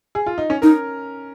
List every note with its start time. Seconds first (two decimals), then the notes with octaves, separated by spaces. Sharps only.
0.15 G#4
0.26 F4
0.38 D#4
0.50 C#4
0.62 D#4 A#4